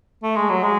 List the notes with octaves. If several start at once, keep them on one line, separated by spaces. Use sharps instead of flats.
A3
G#3
F#3
G#3